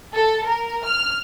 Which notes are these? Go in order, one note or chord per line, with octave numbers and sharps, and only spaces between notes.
A4
A#4
F6